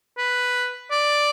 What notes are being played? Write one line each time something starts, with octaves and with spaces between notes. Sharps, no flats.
B4
D5